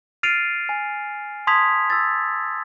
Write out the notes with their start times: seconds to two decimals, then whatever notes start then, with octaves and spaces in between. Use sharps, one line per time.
0.23 F6 A6 C7 D7 D#7 F7
0.69 G#5
1.47 A5 C6 D#6 G#6 B6 F7
1.90 E6 A6